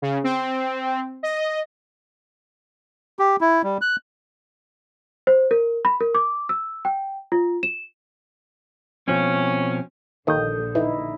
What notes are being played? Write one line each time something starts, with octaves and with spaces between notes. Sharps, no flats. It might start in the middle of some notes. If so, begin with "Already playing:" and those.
C#3
C4
D#5
G4
E4
G3
F#6
C5
A#4
B5
A#4
D6
E6
G5
F4
E7
B2 F3 C4 C#4
A#1 D#2 D3 D#3 A4 D#6 G6
E3 D#4 E4